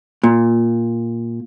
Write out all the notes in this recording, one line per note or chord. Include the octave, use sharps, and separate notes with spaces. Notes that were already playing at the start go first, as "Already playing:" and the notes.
A#2